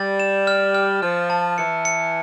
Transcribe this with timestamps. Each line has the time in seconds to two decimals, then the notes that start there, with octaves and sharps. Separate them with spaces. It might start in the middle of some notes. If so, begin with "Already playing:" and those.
Already playing: G3 A6
0.20 E7
0.47 F6
0.75 F6
1.02 F3 F6
1.30 A5
1.58 E3 C#7
1.85 C#7